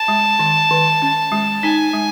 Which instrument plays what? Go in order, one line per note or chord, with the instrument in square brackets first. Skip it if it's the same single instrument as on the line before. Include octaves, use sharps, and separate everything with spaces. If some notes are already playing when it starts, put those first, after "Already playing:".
Already playing: [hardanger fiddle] A5
[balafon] G#3
D#3
D#3
C#4
G#3
[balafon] D#4 [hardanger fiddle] G#5
[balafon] G#3